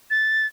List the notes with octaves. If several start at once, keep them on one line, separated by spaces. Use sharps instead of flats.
A6